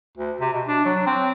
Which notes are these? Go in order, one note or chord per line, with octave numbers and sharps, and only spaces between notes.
D2
C3
B2
D4
F#3
C4